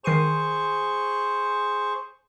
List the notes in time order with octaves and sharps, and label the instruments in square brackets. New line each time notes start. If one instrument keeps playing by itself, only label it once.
[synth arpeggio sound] D#3 C7 D#7 [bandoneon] G#4 C5 C#6